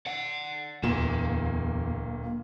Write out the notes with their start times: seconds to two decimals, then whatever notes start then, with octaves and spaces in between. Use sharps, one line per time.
0.06 D5 F#5
0.83 D1 E2 A#2 A#3 E7